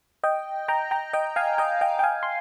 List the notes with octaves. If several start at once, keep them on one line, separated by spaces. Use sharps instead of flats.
D#5 G5
G5 A#5
G5 A#5
D#5 G5
F5 G#5
D#5 G5
D#5 G5
G5
F5 G#5
C6